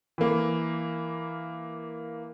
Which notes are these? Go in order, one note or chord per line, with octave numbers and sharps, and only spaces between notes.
E3 A#3